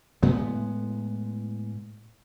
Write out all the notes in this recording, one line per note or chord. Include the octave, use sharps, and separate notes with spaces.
A2 G#3 B3